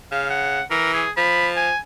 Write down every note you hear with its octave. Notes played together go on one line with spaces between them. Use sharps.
C#3 F5
F#5
E3 A#4
G#4
F3 B5
G#5